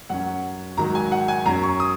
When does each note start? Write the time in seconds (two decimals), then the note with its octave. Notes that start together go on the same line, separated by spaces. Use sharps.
0.10 F#2 F#3 C#4 F#5
0.77 G#2 D#3 F#3 A#5
0.95 G#5
1.12 F#5
1.28 G#5
1.46 F#2 F#3 C#4 A#5
1.63 C#6
1.80 D#6